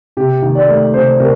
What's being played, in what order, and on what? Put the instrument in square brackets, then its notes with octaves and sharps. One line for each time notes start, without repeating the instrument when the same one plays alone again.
[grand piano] C3 G4
D#3
D5
A3
C3 C5
C3 A#4